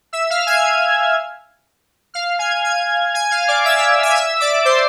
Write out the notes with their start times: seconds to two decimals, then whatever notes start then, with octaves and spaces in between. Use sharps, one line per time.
0.13 E5 E6
0.30 F5 F6
0.47 G#5 G#6
2.14 F5 F6
2.39 G#5 G#6
2.64 G#5 G#6
3.14 G#5 G#6
3.31 F5 F6
3.48 D5 D6
3.65 E5 E6
3.78 E5 E6
4.03 G#5 G#6
4.15 E5 E6
4.40 D5 D6
4.65 C5 C6